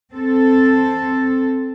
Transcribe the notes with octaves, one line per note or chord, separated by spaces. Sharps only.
C4 A4